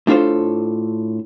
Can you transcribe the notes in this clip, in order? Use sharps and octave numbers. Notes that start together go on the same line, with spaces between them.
A2 D4 F4 A4 C5